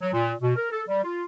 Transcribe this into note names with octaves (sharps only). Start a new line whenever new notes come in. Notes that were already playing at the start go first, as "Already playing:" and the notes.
F#3
A#2
B2
A#4
A4
G3
F4